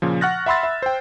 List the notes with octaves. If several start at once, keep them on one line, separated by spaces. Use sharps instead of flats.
A#2 C#3 F3
F#5 C#6 F6 F#6 A6 A#6
E5 F#5 B5 C6 E6 A6
E5
C5 G5